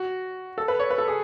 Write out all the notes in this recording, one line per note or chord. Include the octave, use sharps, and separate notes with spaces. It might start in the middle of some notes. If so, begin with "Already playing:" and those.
Already playing: F#4
A4
B4
C#5
B4
A4
G#4